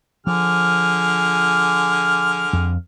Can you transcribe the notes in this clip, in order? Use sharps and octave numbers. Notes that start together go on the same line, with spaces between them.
D3 F3 G#4 F6
F2